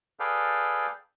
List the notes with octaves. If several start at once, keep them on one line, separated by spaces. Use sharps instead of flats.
G#4 A4 B4 D5 F5 G5